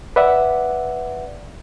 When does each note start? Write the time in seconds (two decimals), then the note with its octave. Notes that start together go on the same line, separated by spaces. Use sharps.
0.16 B4 D5 E5 F#5